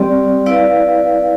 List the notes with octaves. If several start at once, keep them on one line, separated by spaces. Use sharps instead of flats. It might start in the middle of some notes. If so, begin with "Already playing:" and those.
Already playing: G3 C4 G4 D5
E4 B4 D5 F5